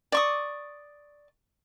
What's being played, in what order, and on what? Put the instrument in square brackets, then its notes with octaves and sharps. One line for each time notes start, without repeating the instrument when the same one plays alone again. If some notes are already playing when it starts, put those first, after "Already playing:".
[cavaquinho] D5 C#6 D#6